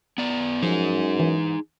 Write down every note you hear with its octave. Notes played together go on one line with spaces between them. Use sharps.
B3 D5
F#2 F3 D#4 G#4
E3